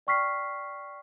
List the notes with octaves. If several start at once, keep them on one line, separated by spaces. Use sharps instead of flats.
D5 G5 C#6 F6 B6 C7